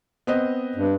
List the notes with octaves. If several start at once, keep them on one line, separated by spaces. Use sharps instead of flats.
B3 C4 D#5
G2